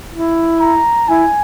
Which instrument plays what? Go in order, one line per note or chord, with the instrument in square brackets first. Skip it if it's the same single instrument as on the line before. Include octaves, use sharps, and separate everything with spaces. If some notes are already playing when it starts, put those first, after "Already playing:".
[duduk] E4
[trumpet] A#5
[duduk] E4 [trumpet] G#5